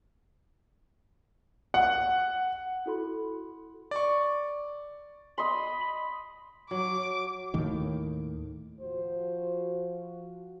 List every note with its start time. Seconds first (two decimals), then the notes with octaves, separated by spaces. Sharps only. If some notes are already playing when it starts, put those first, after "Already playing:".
1.74 F#5
2.86 E4 F#4 A4 B5 C6
3.91 D5 C#6
5.38 D#5 B5 C6
6.71 F#3 D6
7.54 D#2 A2 D#3
8.81 F3 F#4 C5